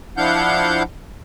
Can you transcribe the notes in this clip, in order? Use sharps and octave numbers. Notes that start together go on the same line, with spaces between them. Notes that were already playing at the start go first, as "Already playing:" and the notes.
F3 D4 E4 F5 F#5 G6